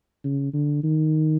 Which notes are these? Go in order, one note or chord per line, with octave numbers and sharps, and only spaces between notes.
C#3
D3
D#3